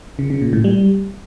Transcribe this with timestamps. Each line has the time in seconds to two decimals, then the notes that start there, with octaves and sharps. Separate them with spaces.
0.19 C#3
0.30 C#3
0.42 A#2
0.53 A2
0.64 G3